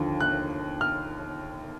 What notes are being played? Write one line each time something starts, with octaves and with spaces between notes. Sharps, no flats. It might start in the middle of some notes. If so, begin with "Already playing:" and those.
Already playing: D#2 D3 F3
F#6
F6